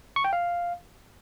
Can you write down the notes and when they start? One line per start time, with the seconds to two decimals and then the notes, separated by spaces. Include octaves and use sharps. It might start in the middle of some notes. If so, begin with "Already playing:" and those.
0.16 C#6
0.24 G5
0.33 F5